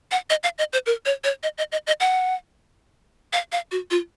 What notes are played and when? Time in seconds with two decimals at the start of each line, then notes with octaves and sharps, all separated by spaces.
0.11 F#5
0.30 D#5
0.43 F5
0.58 D#5
0.73 C5
0.86 A#4
1.06 C#5
1.24 C#5
1.43 D#5
1.58 D#5
1.72 D#5
1.87 D#5
2.00 F#5
3.33 F5
3.52 F5
3.71 F#4
3.91 F4